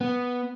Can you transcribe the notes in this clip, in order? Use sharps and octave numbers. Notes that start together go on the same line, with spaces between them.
B3